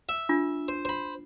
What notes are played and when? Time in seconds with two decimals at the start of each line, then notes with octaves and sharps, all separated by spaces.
0.09 E5
0.29 D4 F4
0.68 C5
0.85 C5 B5